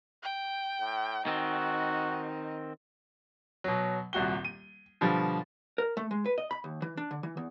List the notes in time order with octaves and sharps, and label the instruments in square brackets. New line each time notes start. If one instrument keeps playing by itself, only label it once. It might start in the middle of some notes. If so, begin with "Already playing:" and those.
[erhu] G5
[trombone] A2
[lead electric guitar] D#3 C4 [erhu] D#4 [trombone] F#4
[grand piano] B2 F#3
D#1 C2 F#4 G7
D#7
B2 D3 F3 G3
[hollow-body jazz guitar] A#4
A3
G#3
B4
D#5
B5
D#2
E3
D4
D3
E3
E2